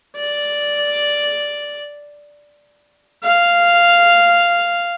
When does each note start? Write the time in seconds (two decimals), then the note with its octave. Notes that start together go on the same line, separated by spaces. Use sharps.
0.16 D5
3.23 F5